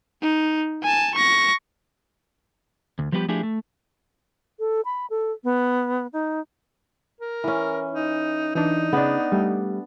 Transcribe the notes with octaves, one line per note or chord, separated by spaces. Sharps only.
D#4
G#5 A5
C#6 A#6
D2
F3 G3 B3 E4 G4 B4
F3 A3 D4 E4 G4 G#4
A3
A4
B5
A4
B3
D#4
A#4
E3 C#4
D#4
E3 D4 D#4
C#3 B3 D4
G3 A3